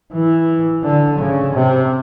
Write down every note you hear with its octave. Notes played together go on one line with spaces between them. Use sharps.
E3
D3
C#3
C3